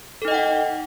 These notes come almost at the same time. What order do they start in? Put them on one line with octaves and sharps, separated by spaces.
A4 D#4 D#5 G5 F#5